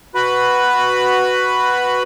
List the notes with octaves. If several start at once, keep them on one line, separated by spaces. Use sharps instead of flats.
F#4 B4 B5